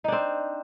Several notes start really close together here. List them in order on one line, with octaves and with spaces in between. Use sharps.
D#4 D4 C4